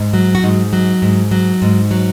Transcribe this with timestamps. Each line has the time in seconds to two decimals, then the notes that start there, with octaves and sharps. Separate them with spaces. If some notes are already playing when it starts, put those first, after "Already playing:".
Already playing: G#2
0.14 F#3
0.35 F#4
0.43 G#2 D#4
0.73 F#3
1.02 G#2
1.31 F#3
1.62 G#2
1.91 F#3